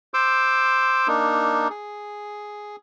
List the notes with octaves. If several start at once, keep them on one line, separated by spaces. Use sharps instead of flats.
C5 C6 D6 E6
A#3 D4 D#4
G#4